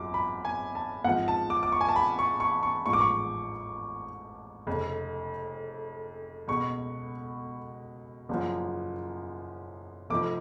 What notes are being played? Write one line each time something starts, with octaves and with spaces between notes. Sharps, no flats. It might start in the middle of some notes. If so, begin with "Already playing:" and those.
Already playing: G#1 F#2 F3 D6
B5
G#5
A5
G#1 G#2 F3 F#5
A5
D6
D6
C#6
G#5
A5
B5
C#6
C#6
C#6
A1 G#2 F3 C#6
D6
C#6
F1 F2 C#3
C#2 B2 C#6
F#1 F#2 F3
F1 F2 F3 D6